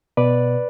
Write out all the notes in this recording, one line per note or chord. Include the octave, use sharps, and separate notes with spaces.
B2 B4 D5